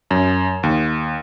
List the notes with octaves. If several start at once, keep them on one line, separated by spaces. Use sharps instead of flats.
F#2
D#2